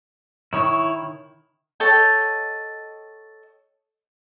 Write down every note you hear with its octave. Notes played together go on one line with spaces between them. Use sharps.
D#3 E4 C#5 C#6
A4 C#5 D#5 G5